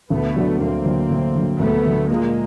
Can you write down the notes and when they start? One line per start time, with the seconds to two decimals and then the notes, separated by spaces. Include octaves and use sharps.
0.10 D2 A3 B3
0.36 D3 F#3
0.61 D2 A#3 C4
0.86 D3 F#3
1.11 D2
1.35 D3 F#3
1.59 D2 A3 B3
1.85 D3 F#3
2.10 A#2 G#3 A#3